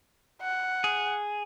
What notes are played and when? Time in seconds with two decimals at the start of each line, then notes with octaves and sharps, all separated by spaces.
0.41 F#5
0.84 G#4